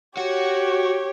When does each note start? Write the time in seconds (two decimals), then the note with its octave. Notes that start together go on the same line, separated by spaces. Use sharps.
0.18 F#4 G4 C#5